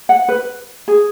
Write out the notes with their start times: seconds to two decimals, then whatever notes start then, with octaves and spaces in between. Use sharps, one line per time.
0.09 F#5
0.29 B4
0.88 G#4